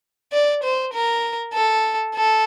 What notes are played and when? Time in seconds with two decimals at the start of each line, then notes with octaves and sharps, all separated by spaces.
0.33 D5
0.64 C5
0.94 A#4
1.54 A4
2.15 A4